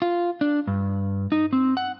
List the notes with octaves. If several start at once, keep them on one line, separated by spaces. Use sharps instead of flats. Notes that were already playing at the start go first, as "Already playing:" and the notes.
F4
D4
G2
D#4
C4
F#5